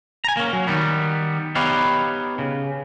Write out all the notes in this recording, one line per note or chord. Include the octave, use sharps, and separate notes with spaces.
G#5 A#5
A#3 C#4
F#3
D#3 G3 B3
B3 D#4 G4 B4 C#5 F5
C#3